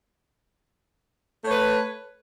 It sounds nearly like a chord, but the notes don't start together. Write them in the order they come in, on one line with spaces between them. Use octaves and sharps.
A3 C#5 B4